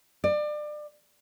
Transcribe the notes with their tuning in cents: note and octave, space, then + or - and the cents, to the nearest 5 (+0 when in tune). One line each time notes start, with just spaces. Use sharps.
D5 +30